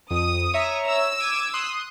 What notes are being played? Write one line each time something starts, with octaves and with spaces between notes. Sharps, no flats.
F2 D#6
C#5 E5 A#5
E6
D6 G#6 D#7
C6 D#6 F#6